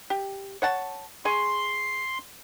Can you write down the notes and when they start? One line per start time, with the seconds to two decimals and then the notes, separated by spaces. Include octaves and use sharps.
0.10 G4
0.62 C#5 F#5 A5
1.25 G#4 G#5 C6 C#6